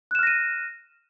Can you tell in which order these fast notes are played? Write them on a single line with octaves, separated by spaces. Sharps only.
F#6 E7 F6 A#6 D#7